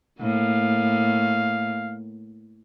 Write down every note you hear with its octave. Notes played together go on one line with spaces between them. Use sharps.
A2 A#3 F5